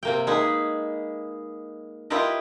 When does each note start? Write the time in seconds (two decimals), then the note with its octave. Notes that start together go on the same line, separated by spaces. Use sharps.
0.03 C3 A#3 G5
0.27 G#3 A#3 D#4 G#4 B4
2.10 E4 F4 G4 A#4 B4 D#5